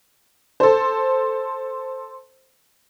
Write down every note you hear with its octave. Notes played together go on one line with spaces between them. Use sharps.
A4 C5